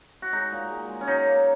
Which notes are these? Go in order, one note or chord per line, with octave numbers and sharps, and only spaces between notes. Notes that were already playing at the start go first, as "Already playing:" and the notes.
F#4
G#3 D#4
A#2
G#3
G#3
C#4
F#3 D#4
A#3